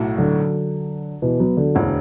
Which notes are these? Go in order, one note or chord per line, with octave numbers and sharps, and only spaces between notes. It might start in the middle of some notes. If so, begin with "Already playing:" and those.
Already playing: B1 A2 A3 F#4
D3 F#3
B2 E3
F#3 B3
D3 F#3
E1 D2 B2 D3 E3